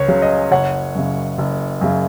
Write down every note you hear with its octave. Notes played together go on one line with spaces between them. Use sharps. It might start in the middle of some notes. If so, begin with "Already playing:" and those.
Already playing: C#2 C#5
C#3 F#3 C#4
D#5
F#1 C#5 F#5
F#2 C#3
F#1
F#2 C#3